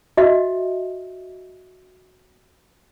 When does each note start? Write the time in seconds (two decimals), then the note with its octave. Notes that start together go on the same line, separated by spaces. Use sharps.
0.17 F#4 D#5 E5